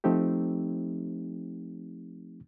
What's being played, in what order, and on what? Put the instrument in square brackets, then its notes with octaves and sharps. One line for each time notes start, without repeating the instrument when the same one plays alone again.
[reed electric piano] F3 A3 C4 D#4 G4